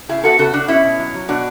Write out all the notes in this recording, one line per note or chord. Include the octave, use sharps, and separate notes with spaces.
C#3 E4 G#4
B3 F#4 A4
C#3 F#4 A4
C#3 D4 F#4
B2 C#4 E4
B2
F#3
F#3
B2 D4 F#4